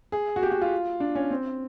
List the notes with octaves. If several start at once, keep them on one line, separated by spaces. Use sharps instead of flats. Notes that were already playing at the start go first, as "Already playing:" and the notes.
G#4
F#4
G4
F#4
F4
D4
C#4
C4